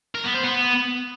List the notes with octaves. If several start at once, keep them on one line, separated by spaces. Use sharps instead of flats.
A#4
B3
C5
B3